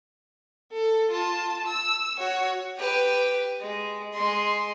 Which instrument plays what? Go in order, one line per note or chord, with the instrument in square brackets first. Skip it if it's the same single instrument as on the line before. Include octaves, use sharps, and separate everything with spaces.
[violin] A4
F4 A5
E6
F#4 C#5
[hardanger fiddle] G4 B4
G#3
G#3 C6